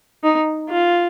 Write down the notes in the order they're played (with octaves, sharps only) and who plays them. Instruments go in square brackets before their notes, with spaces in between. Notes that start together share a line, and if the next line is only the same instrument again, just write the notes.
[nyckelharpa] D#4
F4